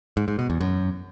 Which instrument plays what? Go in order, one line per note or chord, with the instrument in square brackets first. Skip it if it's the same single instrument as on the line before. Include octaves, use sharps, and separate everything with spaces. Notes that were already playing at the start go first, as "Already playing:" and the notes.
[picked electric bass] G#2
G#2
B2
E2
F#2